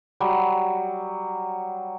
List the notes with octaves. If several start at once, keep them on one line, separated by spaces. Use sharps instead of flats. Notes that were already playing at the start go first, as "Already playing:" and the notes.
F#3 G3